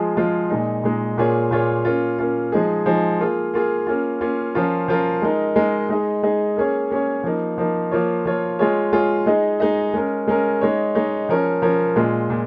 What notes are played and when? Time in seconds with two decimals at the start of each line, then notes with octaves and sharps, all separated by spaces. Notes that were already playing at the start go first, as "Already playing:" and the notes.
Already playing: F3 G#3 F4 G#4
0.17 F3 G#3 F4 G#4
0.50 A#2 G#3 D#4
0.83 A#2 G#3 D#4
1.18 A#2 A#3 F4 G#4 C#5
1.51 A#2 A#3 F4 G#4 C#5
1.85 A#3 C#4 F4
2.19 A#3 C#4 F4
2.52 F3 G#3 D#4 G#4
2.86 F3 G#3 D#4 G#4
3.20 A#3 F4 G#4
3.54 A#3 F4 G#4
3.87 A#3 C#4 F4
4.21 A#3 C#4 F4
4.55 F3 C#4 F4 A#4
4.88 F3 C#4 F4 A#4
5.22 G#3 D#4 A#4
5.56 G#3 D#4 A#4
5.89 G#3 D#4 G#4 D#5
6.23 G#3 D#4 G#4 D#5
6.57 A#3 C#4 G#4 C#5
6.90 A#3 C#4 G#4 C#5
7.24 F3 A#3 D#4
7.58 F3 A#3 D#4
7.91 F3 A#3 F4 C#5
8.25 F3 A#3 F4 C#5
8.59 G#3 F4 G#4 C#5
8.92 G#3 F4 G#4 C#5
9.26 G#3 D#4 G#4 D#5
9.60 G#3 D#4 G#4 D#5
9.94 G#3 C#4 A#4
10.27 G#3 C#4 A#4
10.61 G#3 D#4 C#5
10.95 G#3 D#4 C#5
11.29 F3 C#4 A#4 C#5
11.62 F3 C#4 A#4 C#5
11.96 A#2 G#3 F4
12.30 A#2